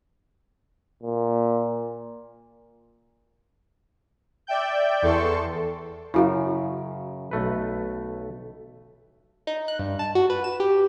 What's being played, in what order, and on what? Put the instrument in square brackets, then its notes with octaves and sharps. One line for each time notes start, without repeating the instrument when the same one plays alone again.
[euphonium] A#2
[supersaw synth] D5 E5 G5 G6
E2 A4 C6 C#6
[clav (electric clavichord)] F#2 C#3 [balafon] E4 F#4 F5
[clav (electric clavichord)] B1 A3 B4
[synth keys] D#4
F#6
G2
A5
F#4
B4
E7
G4